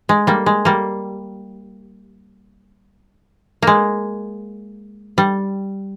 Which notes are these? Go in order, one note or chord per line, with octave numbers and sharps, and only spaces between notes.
G#3
G3 A#3
G#3
G3 A#3
G#3 A#3
G3